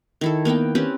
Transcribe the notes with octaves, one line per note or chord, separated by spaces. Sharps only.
D#3 E4 A4
A#3 B3 B4 G5
C4 C#4 G4 B4